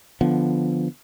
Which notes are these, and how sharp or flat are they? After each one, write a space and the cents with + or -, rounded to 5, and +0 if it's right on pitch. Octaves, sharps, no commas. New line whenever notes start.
D3 +0 F3 -10 B3 +0